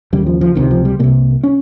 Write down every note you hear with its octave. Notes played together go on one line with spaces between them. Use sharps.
D#2 C#3 G3
F3
F3
C#2 C3 D#3
F3
G3
C2 C3 A#3
C#4